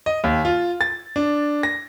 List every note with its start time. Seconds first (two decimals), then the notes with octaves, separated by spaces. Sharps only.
0.06 D#5
0.24 D#2
0.45 F4
0.81 A6
1.16 D4
1.63 A#6